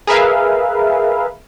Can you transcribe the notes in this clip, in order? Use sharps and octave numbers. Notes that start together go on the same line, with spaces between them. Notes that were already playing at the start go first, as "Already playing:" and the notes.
G#4 A#4 B4 E5 F5